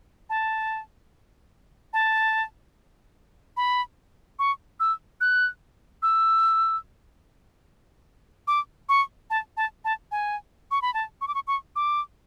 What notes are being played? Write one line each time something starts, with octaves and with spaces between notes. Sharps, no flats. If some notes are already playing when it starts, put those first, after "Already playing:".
A5
A5
B5
C#6
E6
F#6
E6
D6
C#6
A5
A5
A5
G#5
C#6
B5
A5
C#6
D6
C#6
C#6
D6